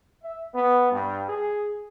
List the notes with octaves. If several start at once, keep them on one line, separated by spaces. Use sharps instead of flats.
E5
B3
G2
G#4